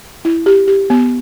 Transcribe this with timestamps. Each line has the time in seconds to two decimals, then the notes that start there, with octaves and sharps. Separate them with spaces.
0.25 E4
0.46 G4
0.68 G4
0.90 B3